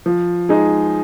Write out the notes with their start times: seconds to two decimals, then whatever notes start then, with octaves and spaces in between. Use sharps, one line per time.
0.06 F3
0.49 G#3 D#4